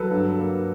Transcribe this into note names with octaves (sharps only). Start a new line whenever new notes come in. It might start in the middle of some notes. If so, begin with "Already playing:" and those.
Already playing: F#3 A4 B4
G2
A#3